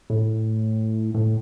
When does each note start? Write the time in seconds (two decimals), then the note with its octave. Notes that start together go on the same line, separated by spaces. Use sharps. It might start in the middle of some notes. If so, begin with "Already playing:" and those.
0.10 A2
1.15 A2